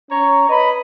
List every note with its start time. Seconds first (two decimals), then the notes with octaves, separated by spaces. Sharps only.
0.10 C#4 C#5 A#5
0.49 B4 D#5 B5